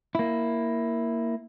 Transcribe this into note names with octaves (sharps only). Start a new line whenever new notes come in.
A#3 E4